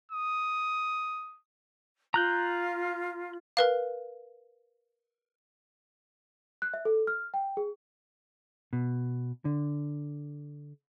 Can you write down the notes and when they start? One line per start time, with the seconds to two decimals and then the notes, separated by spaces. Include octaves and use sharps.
0.12 D#6
2.14 F4 A#5 F#6 G6
3.57 A#4 B4 F5
6.62 F#6
6.74 E5
6.85 A4
7.07 F6
7.34 G5
7.57 G#4
8.73 B2
9.45 D3